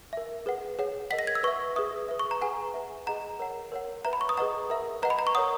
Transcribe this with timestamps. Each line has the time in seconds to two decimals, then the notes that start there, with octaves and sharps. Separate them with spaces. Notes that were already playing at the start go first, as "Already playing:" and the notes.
0.13 A#4 E5
0.46 G#4 B4 F#5
0.79 G#4 C#5 F#5
1.11 A#4 D#5 F#5 B6
1.19 A#6
1.27 G#6
1.35 E6
1.43 B4 E5 C#6
1.76 G#4 B4 E5 D#6
2.09 B4 E5
2.19 C#6
2.31 A#5
2.41 G#4 B4 F#5 G#5
2.74 B4 E5
3.07 G#4 D#5 F#5 A#5
3.40 A#4 C#5 F#5
3.72 A#4 C#5 F#5
4.05 B4 E5 A#5
4.13 B5
4.21 C#6
4.29 D#6
4.37 G#4 B4 D#5 F#5 A#5
4.70 A#4 E5
5.03 B4 D#5 F#5 A#5
5.10 B5
5.19 A#5
5.27 C#6
5.35 A#4 C#5 F#5 D#6